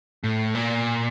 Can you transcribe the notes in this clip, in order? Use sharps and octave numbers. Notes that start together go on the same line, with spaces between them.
A2
A#2